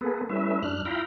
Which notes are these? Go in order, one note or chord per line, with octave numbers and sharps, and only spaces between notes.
A#3 B3 G#4 A4 B4
G3 A3 C#4 E4 B4 E5
F#2 D4 F6 F#6
E4 F4 F5 G5 A#5 B5